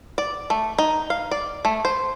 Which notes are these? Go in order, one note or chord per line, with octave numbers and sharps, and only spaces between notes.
D5
A3
D#4
F5
D5
A3
C5